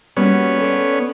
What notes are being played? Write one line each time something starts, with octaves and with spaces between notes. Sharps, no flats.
G3 A#3 B3 C#4 F#4
A4 C5 D5